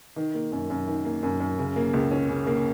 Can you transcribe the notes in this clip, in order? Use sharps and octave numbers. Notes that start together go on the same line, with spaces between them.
D#3
A#3
F#2
F#2
D#3
A#3
F#2
F#2
C#3
A#3
C#2
C#4
C#3
A#3